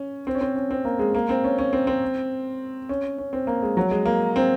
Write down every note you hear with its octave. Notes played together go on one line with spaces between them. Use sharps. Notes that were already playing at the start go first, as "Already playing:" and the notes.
Already playing: C#4
C4
C#4
C4
C#4
C4
A#3
G#3
A#3
C4
C#4
C#4
C4
C4
C#4
C#4
C4
A#3
G#3
F#3
G#3
A#3
C4